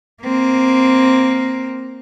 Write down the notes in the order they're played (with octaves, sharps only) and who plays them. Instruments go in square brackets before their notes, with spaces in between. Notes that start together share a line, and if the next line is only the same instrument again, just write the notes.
[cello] A#3 C4